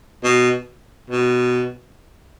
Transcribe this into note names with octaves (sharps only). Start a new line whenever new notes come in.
B2
B2